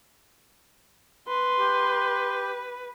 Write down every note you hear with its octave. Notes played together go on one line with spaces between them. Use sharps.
B4 C6
G4